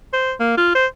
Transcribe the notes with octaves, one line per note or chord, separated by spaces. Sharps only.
C5
A#3
F4
C5